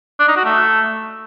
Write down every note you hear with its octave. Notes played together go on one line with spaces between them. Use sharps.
D4
D#4
F#4
A3